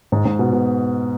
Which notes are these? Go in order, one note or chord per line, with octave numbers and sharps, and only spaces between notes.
G#2
G#2
B2
B2